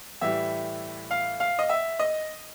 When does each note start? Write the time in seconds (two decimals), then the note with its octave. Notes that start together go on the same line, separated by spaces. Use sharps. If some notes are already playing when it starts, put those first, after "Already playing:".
0.21 A2 E3 G3 E5
1.11 F5
1.40 F5
1.59 D#5
1.69 E5
1.99 D#5